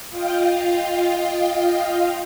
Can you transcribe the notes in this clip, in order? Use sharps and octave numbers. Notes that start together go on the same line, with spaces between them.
F4 D#5 F5 G5